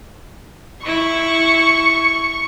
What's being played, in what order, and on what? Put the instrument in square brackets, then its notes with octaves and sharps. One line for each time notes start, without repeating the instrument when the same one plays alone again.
[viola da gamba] E4 [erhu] C#6